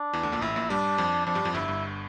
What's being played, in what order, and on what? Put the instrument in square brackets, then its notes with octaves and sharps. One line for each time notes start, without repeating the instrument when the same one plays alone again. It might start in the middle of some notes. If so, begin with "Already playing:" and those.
Already playing: [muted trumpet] D4
[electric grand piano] E2 E3
D2 D3
A#1 A#2
[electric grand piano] A1 A2 [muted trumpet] E4
[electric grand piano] A#1 A#2
[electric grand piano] G2 G3 [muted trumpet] D4
[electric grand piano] F2 F3
[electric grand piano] F2 F3 [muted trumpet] D4
[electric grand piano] G2 G3
F2 F3
[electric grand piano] G1 G2 [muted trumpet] E4
[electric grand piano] G1 G2